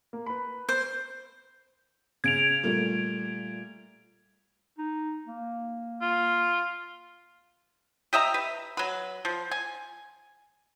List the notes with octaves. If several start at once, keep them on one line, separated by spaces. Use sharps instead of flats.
A#3
B4 B5
C5
C#3 G#6 D7 F7
A#2 G3 A3
D#4
A#3
F4
G4 D#5 E5 A#5
B4
F#3 B4
F3
G#5